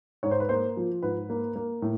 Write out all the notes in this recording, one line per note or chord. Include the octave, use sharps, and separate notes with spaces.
G#2 C#5
C5
B4
A#3 C5
F3
G#2 B4
A#3
A#3
A2